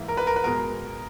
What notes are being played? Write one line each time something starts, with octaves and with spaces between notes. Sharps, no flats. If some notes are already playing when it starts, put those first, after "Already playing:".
Already playing: G#2 E3 A#3 E4
A#4
B4
A#4
B4
B2 G#3 B3 A#4